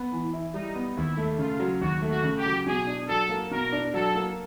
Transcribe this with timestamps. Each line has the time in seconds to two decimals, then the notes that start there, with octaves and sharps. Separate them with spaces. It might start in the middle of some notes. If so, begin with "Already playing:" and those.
Already playing: B3
0.12 E3
0.33 E4
0.54 G3 D#4
0.75 B3
0.96 D#2 E4
1.17 A3
1.38 C#3 F4
1.60 F#3
1.81 D#2 F#4
2.02 A3
2.10 F#4
2.23 C#3
2.38 G4
2.46 F#3
2.67 B2 G#4
2.87 D4
3.08 F#3 A4
3.29 A#3
3.51 B2 A#4
3.72 D4
3.94 F#3 A4
4.15 A#3